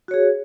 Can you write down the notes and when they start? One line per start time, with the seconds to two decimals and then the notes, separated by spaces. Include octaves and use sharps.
0.08 F#4
0.11 C#5
0.14 G#4